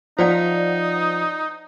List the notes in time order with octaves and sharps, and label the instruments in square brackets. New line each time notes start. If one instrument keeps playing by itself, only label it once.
[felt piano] F3 [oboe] D#4 [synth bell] C5 D5 F#5